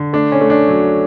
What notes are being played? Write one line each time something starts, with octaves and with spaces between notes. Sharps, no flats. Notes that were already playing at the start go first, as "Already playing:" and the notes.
Already playing: D3
A3 D4
C#4
A3
D4
F#3